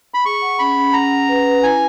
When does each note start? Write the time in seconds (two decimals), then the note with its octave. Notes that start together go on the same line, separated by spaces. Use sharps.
0.14 B5
0.25 G#4 C#6
0.42 F#5
0.59 C#4 B5
0.77 C#4
0.94 F#5 A#5
1.11 F#5
1.29 B4
1.47 B4
1.63 E4 G#5